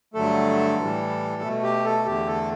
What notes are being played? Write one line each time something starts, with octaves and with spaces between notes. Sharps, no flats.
G2 D3 F#3 A3 A4
A2 E3 G3
B2 A3
G4
A4
E2 D3 A3 G4
A4